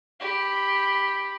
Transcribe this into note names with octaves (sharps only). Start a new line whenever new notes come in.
G4 B5